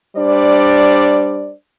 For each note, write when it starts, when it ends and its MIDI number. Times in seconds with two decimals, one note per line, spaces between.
0.16 1.52 55
0.16 1.52 62
0.16 1.52 72
0.16 1.52 74